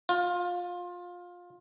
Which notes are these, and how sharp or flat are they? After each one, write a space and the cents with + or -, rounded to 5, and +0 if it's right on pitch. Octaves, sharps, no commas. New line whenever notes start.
F4 +20